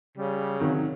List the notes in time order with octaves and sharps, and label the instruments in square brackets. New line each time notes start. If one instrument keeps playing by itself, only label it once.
[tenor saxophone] C#3 [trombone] G3
[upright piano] C3 D#3 [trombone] F#3